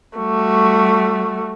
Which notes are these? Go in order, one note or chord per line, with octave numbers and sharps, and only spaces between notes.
G3 A3 F#4